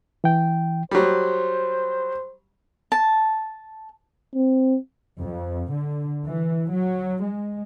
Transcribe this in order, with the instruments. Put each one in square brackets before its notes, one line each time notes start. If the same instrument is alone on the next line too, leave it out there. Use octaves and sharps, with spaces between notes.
[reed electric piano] E3 G5
[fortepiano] F#3 G3 [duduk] C5
[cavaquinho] A5
[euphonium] C4
[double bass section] F2
D3
E3
F#3
G#3